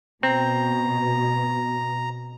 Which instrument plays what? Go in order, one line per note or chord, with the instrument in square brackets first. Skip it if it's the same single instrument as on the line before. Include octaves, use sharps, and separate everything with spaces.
[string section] B2 [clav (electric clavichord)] C4 [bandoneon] A#5